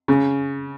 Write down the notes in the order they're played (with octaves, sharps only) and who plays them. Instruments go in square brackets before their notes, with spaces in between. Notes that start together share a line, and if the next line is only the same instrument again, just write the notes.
[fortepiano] C#3